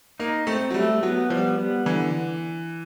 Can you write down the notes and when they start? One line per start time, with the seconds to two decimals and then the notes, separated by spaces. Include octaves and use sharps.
0.20 A#3 D#4
0.47 A3 C4
0.70 F#3
0.74 G3 A3
1.03 F#3 B3
1.30 F3 G3
1.58 B3
1.86 D3 E3